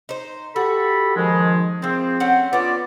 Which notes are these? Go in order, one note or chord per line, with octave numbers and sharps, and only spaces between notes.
D#4 C5
F#4 G4 A4 B5
D#3 F3 G#3
F3 G#3 C4
A3 C#4 F#5
B3 C#4 D4 F4 D5